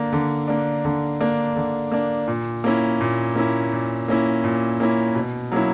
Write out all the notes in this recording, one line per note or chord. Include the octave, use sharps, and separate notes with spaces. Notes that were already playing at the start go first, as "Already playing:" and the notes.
Already playing: D3 A#3 D4
D3
A#3 D4
D3
A#3 D4
D3
A#3 D4
A#2
A#3 C#4 E4
A#2
A#3 C#4 E4
A#2
A#3 C#4 E4
A#2
A#3 C#4 E4
B2
F#3 A#3 C#4 E4